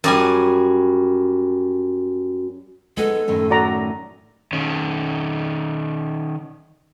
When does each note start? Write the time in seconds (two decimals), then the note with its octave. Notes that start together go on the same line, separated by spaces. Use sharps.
0.04 F#2 G3 G#5
2.97 G#3 B3 D#4 A4
3.28 F#2 A2 D#3
3.50 F#4 D5 A#5
4.53 D#3 C#4